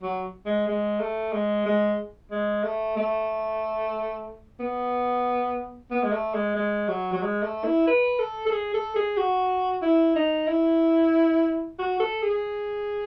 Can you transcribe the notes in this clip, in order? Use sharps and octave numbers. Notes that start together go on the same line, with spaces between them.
F#3
G#3
G#3
A3
G#3
G#3
G#3
A3
A3
B3
B3
G#3
A3
G#3
G#3
F#3
F#3
G#3
A3
E4
B4
A4
A4
G#4
A4
G#4
F#4
E4
D#4
E4
F#4
A4
G#4